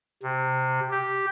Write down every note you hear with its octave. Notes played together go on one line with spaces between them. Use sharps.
C3
G4